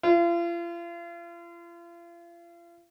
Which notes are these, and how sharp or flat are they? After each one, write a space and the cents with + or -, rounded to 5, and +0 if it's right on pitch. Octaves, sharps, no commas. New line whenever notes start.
F4 -40